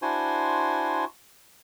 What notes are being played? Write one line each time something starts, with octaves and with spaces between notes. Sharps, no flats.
D4 E4 F#4 C5 G#5 C6